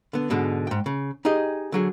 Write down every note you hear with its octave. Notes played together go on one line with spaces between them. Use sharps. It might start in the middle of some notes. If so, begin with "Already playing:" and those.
D3 B3
G#2 B2 D3 G#3
G#2 G5
C#3
D#4 G4 G#4 D#5
D3 F#3 G#4